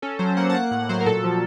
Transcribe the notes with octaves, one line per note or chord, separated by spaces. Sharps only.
C#4 A4
F#3 C5
A#3 F#5
A5
A#3 F#5
A2 F#5
F#3 C5
A#4
A#2 A4
F3